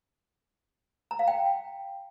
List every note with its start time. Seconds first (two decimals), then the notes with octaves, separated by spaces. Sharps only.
1.11 A#5
1.19 F5
1.28 G5